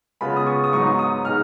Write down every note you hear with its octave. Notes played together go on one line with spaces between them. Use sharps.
C#3 G#3 B3 F4 B5
D#6
C#6
D#6
G#2 F#3 B3 D#4 C#6
D#6
B2 G#3 D#4 F6